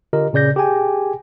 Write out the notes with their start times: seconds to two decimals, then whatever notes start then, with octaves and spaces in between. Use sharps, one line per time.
0.13 D3 F4 G4 A#4 D#5
0.33 A#2 C#3 D5 G6 A#6
0.56 G4 G#4 G5 G#5